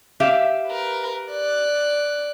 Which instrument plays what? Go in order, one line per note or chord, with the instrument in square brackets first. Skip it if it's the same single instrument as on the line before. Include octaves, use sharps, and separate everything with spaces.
[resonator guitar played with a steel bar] G4 E5 F5
[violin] A#4 B4
D5 F#6